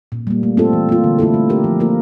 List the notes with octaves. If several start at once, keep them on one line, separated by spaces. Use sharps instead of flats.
A#2
G3 A#3
A3
C4 F4 A4
E3
A#3 F4
D3
A3 C4 E4 A4
A3
D4 G4 A#4
F3
A#3 F4 A#4